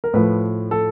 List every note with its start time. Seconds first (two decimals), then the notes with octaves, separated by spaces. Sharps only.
0.04 A#4
0.14 A2 F3 B4
0.71 A4